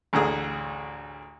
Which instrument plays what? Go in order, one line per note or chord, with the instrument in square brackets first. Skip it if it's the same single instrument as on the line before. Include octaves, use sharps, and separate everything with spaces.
[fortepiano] A1 D2 G#4